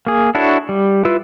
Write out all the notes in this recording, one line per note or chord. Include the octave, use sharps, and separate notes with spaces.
A#3 G#4
D4 E4 F#4 A4 C#5
G3
E4 F4 B4 E6